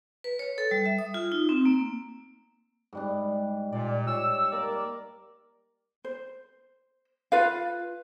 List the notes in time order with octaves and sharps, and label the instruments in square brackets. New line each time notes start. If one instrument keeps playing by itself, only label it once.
[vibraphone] B4
C#5
A4
G3
E5
D#6
F4
D#4
C4
A#3
[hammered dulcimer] G#2 G3 D4
[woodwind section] A#2 [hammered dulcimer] D5
[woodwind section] C#5 E6
[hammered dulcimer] A#3 [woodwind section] A#4 D5
[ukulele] C5
F4 B4 F5